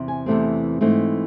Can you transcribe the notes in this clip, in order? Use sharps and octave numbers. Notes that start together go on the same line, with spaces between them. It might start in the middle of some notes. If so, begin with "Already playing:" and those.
Already playing: E2 C3
G#5
E2 C3 E3 A3 C4
G#2 E3 A3 C4